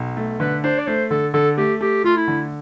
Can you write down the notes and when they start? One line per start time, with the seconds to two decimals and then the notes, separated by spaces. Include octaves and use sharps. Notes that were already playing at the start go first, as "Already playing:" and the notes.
Already playing: B1
0.17 A3
0.40 D3 B4
0.64 D4 C5
0.78 D5
0.87 A3 C5
1.10 D3 A4
1.33 D3 A4
1.57 A3 G4
1.81 A3 G4
2.04 A3 F4
2.17 E4
2.28 D3